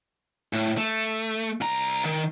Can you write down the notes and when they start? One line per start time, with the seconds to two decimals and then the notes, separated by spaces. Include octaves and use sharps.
0.53 A2
0.77 A3
1.61 C2 A#5
2.05 D#3